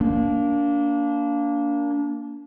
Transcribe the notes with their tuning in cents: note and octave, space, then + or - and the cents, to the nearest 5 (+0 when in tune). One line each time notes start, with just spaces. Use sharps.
A#3 +0 D4 -25